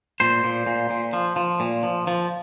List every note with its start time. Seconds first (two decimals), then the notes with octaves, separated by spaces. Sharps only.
0.20 A#2 C5
0.44 A#2
0.66 A#2
0.90 A#2
1.13 F3
1.36 F3
1.60 A#2
1.83 F3
2.07 F3